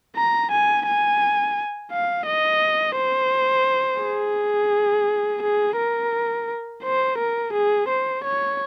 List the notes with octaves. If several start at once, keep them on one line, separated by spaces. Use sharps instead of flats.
A#5
G#5
G#5
F5
D#5
C5
G#4
G#4
A#4
C5
A#4
G#4
C5
C#5